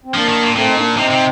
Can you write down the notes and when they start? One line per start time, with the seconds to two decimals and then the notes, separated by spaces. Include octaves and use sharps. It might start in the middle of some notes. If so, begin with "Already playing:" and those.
0.05 C4
0.14 F3 A#3 D4
0.29 D#3
0.42 A#2
0.56 A#2 A3 C4
0.68 D#4
0.77 A#3 D4
0.97 C3 C4 D#4
1.10 C3